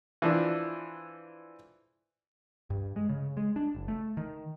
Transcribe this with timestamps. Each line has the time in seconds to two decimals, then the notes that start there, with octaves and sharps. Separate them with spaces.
0.22 E3 F3 D4
2.70 G2
2.96 G#3
3.09 C#3
3.37 G#3
3.56 D4
3.75 F#1
3.88 A3
4.17 D#3